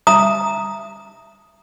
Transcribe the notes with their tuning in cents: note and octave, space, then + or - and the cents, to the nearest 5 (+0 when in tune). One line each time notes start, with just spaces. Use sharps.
E5 +20 A#5 +0 D#6 +0